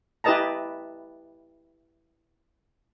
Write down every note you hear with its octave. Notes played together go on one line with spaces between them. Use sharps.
E4 G4 B4 D#5 A5 A#5